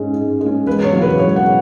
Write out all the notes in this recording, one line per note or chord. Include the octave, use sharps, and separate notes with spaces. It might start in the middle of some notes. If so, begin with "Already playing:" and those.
Already playing: G#2 G#3 C#4
G#2
G#3
C#4
E1 B4
C#5
E2 C#3 F#3
B4
E1 C#5
F#5